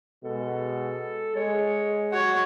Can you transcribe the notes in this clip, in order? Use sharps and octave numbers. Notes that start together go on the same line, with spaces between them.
B2 G#3 A4
G#3 C#5
F#4 C#5 F#5